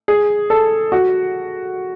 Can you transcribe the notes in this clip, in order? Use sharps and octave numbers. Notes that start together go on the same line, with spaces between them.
G#4
A4
F#4